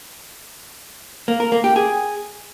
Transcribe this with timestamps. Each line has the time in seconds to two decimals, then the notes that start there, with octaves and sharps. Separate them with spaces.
1.28 A#3
1.40 A#4
1.52 A#3
1.64 G4
1.76 G#4